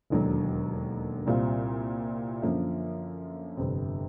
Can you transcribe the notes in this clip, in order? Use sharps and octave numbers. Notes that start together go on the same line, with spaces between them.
E1 D#2 D3 F#3
C2 A#2 G3 C4 F4
F#2 D3 F3 A#3
G1 F2 C3